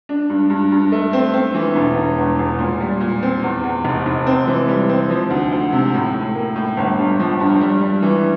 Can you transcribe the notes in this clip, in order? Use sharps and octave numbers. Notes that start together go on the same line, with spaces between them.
D4
G2
G2
G2
A3
C4
C4
E3
E1
E1
E2
E1
A#2
G3
A#2
C4
E2
E2
F1
F1
C4
E3
G3
C4
F3
D2
D2
C3
A2
A2
A#3
A2
G1
G2
F3
G2
G3
G3
E3